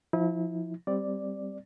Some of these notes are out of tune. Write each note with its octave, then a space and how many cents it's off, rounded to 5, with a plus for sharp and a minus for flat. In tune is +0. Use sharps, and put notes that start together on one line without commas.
F3 +0 E4 -35
G3 +0 C4 +0 D5 +0